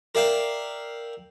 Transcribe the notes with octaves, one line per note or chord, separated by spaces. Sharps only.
A#4 D5 E5 F5 G5